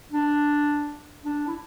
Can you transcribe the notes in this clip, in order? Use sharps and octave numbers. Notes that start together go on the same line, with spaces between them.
D4
D4
E4